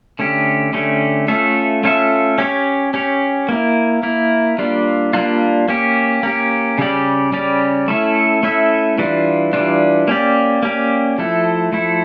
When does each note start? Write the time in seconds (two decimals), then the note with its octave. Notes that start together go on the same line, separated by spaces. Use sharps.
0.19 D3 A3 C#4 G4
0.73 D3 A3 C#4 G4
1.28 A3 C#4 F4 A4 E5
1.84 A3 C#4 F4 A4 E5
2.38 C#4 G4 C#5
2.94 C#4 G4 C#5
3.49 A#3 E4 A#4
4.03 A#3 E4 A#4
4.58 G3 A#3 D4 F4
5.13 G3 A#3 D4 F4
5.68 A#3 C#4 G4
6.23 A#3 C#4 G4
6.78 C#3 G3 C#4 G4 D5
7.33 C#3 G3 C#4 G4 D5
7.88 A3 C#4 E4 A4 E5
8.43 A3 C#4 E4 A4 E5
8.98 E3 G3 D4 F4
9.53 E3 G3 D4 F4
10.08 A#3 C#4 G4 D5
10.63 A#3 C#4 G4 D5
11.18 F3 A3 E4 A4
11.72 F3 A3 E4 A4